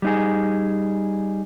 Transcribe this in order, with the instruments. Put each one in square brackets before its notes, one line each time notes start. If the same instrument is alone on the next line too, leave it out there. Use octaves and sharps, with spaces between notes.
[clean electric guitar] G3 D#4 G#4